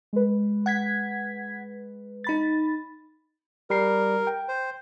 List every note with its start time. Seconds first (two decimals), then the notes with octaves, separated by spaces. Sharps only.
0.13 G#3 B4
0.66 F#5 G#6 B6
2.24 D#4 B5 A6
3.70 G3 A#4 C7
4.27 G5
4.49 C5